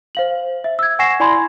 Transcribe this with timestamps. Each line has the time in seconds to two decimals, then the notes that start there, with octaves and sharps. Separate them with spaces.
0.15 C5 F5 F#7
0.64 E5
0.79 E6 G#6
0.99 F#5 G#5 C#6 A#6 C7 E7
1.20 E4 D5 G#5 B5 C6 G#6